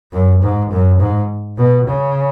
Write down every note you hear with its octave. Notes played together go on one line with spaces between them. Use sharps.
F#2
G#2
F#2
G#2
B2
C#3